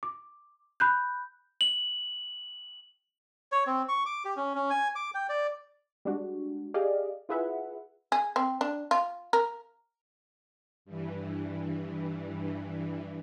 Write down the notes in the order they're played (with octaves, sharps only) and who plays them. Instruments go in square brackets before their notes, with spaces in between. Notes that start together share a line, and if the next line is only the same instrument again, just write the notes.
[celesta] D6
B5 F#6 G6
[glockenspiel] F#7
[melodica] C#5
C4
C#6
D6
G4
C#4
C#4
G#5
D6
G5
D5
[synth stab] G3 G#3 D4 F#4
G4 G#4 D5 D#5 F5
E4 F4 G#4 B4 E5 F#5
[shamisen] G#4
C4
D4
F4
A#4
[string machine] G2 E3